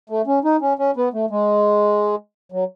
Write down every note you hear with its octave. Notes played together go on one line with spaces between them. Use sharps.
A3
C#4
D#4
C#4
C#4
B3
A3
G#3
F#3